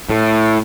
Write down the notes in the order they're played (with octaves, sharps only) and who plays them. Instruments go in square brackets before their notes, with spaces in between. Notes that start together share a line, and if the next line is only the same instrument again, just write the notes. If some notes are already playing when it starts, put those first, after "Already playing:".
[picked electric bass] A2